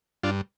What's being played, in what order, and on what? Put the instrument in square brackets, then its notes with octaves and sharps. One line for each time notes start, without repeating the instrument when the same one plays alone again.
[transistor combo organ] G2 D4 F4